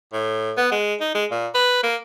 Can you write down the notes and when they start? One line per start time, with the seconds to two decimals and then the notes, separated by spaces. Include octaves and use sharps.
0.13 A2
0.57 B3
0.72 G#3
1.01 D#4
1.15 G#3
1.31 A#2
1.55 B4
1.84 A#3